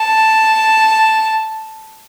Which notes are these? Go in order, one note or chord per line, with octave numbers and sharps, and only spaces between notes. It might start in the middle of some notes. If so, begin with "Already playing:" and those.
Already playing: A5